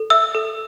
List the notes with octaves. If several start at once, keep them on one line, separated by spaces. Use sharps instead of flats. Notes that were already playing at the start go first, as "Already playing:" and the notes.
Already playing: A4
E5 E6
A4